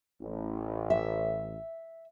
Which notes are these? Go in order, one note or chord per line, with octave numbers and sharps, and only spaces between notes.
A1
E5